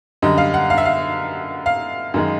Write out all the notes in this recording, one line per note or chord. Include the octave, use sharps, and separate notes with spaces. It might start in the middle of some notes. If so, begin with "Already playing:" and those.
F#2 D3 G3 D#5
F5
F#5
F5
E5
F5
F5
F#2 D#3 G#3